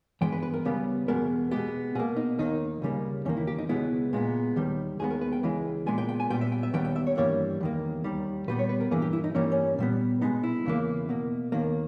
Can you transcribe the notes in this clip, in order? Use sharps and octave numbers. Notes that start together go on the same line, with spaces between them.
G2 E3 G#3 B3 G5
B4
B4
A#4
C#2 C#3 G3 B3
E2 B2 G#3 B3 A#4
B2 G#3 B3 G4
B2 A#3 G#4
D#4
D#2 D#3 A#3 D#4
C#2 C#3 G3 A#3
E2 D#3 A#3 C#4
E4
G4
D#4
C#2 B2 G#3 B3 E4
A#2 G#3 B3
D#2 D#3 G3
D#2 D#3 G#3 B3 G#4
A#4
B4
G5
C#2 C#3 E3 G#3
A#2 G#3 B3 G#5
G5
G5
G#5
A#2 G3 B3 G5
E5
G5
E5
D#2 D#3 G3 B3 G5
G5
E5
C#5
G2 E3 G3 A#3 C#5
E2 D#3 A#3
D#2 D#3 G3
A#2 G3 B3 B4
C#5
B4
A#4
G2 E3 A#3 G#4
G4
E4
D#4
G2 E3 G3 A#3 C#4
C#4
A#2 G3 B3
B2 G#3 B3 D#4
E4
E2 C#3 E3 A#3
B2 A#3
D#2 D#3 A#3